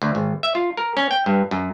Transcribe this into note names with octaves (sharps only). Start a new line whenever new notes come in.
D2
G#1
E5
F4
A#4
C#4
G5
G2
F#2